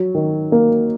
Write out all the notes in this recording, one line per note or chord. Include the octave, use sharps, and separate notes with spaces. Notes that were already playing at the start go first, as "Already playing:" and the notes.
Already playing: F#3
D#3
A#3